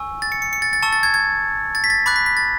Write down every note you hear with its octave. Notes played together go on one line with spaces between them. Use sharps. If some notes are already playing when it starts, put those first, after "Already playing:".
Already playing: G#5 C#6 E6
A6
C#7
C#7
C#7
A6
A6
A5 C#6 E6
A6
G#6
G#6
A6
B6
A6
B5 D6 F#6 A6
B6
B6
A6